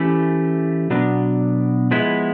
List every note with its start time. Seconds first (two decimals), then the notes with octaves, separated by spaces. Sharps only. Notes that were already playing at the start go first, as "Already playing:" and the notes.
Already playing: E3 A3 C#4 E4 G4
0.90 B2 F#3 B3 D4
1.91 F3 G#3 B3 E4